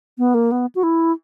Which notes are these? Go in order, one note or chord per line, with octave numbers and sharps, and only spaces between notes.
B3
A#3
B3
F#4
E4